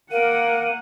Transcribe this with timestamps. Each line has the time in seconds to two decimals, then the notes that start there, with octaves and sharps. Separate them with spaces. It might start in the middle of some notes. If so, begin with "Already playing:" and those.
0.11 A#3 A#4 F5 F#5 D#7